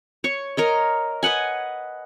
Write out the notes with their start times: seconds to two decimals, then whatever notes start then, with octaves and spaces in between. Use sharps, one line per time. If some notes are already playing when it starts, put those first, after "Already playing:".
0.24 C#5 C#6
0.57 A#4 C#5 D#5
1.23 B4 D#5 F#5 G#5